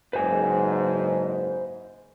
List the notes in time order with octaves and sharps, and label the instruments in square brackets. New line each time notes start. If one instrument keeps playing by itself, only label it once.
[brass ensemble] F#1 G#2 [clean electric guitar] B4 C5 G#5